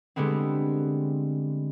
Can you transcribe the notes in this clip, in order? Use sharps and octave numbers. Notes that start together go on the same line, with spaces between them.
D3 G3 G#3 B3 C4